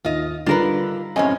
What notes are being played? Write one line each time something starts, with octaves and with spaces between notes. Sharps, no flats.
D#2 F4 D#5
D3 G3 D4 D#4 F4 A#4 B4
F#2 A2 C4 C#4 D#5 G#5